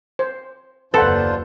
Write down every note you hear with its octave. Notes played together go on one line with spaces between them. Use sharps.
C5
F#1 D#2 D4 F4 A4 B4 C5 F#5